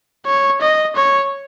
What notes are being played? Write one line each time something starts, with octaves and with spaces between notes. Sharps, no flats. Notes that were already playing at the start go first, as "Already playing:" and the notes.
C#5
D#5
C#5